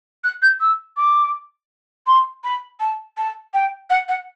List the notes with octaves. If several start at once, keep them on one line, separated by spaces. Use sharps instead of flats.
F#6
G6
E6
D6
C6
B5
A5
A5
G5
F#5
F#5